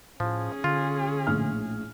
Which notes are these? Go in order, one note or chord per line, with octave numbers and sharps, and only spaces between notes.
A2 F3 C#4 G#4
D3 F4
A#1 A2 F6